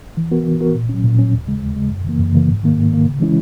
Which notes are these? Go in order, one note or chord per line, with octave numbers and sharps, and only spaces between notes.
E3
B3 F#4 A#4
E3
B3 F#4 A#4
A#2
F#3 C#4
A#2
F#3 C#4
D#2
C#3 G#3
D#2
C#3 G#3
F#2
C#3 E3 A#3
F#2
C#3 E3 A#3
G#2
D#3 A#3
G#2
D#3 A#3
C#3
E3 G#3 C#4 E4